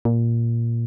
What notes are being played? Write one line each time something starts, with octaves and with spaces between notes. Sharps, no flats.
A#2